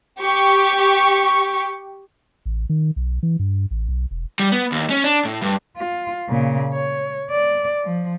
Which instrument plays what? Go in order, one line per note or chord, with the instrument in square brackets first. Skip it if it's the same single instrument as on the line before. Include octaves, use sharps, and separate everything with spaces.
[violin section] G4 C#6
[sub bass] A1
D#3
B1
E3
G2
A1
B1
E1
[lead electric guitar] G3
B3
D#2
C#4
D4
A2
G2
[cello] F4
A#2 C#3
C#5
D5
F3